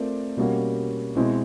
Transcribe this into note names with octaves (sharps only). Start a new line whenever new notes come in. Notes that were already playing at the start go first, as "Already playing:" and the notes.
Already playing: A3 C4 F4 A#4 D5
B2 G3 A#3 C#4 F#4
B2 G#3 C4 E4